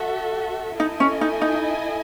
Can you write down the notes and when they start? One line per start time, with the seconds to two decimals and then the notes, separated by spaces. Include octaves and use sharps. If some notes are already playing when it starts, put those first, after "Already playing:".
Already playing: F#4 A4 E5
0.80 D#4 E4 A4 D#5 G#5
1.00 C#4
1.21 D#4
1.41 D#4